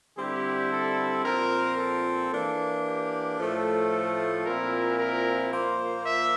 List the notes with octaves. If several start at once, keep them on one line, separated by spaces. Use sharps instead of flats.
D3 G3 C4 E4 G4
A4
A#2 F3 C4 A#4
A4
E3 A#3 D4
G4
A2 F3 A3 A4
A#2 F3 C4 E4 A#4
A#4
A#2 F3 A#3 C5
E5